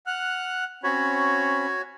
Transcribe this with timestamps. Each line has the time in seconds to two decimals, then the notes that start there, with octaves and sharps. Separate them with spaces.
0.07 F#5 F6 F#6
0.84 C4 C#4 F#4 C#5 B5